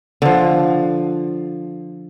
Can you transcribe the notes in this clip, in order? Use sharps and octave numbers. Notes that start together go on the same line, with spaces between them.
D3 F3